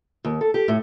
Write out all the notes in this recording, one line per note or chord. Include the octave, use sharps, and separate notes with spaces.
D#2
A4
G4
A2